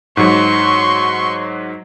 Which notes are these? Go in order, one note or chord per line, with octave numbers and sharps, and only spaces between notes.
G#2 F#3 C6 C#6